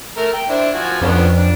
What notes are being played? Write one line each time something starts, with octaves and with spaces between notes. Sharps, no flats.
A3 A#4
G5
D4 E4 C5
F3 F#4 G#5
F2 B3 C#4 D4
D4